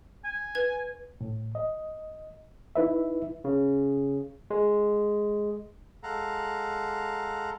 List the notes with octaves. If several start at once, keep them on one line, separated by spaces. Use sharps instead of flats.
G#5
B4 G#6
A2
D#5
D#4 E4 B4 E5
C#3
G#3
G#3 A4 F5 F#5 A#5